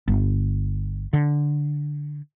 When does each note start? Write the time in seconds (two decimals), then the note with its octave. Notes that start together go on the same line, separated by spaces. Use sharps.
0.08 G1
1.13 D3